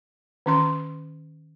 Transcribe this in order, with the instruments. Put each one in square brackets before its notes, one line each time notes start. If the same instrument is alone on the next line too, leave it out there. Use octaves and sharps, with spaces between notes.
[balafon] D#3 C#4 C6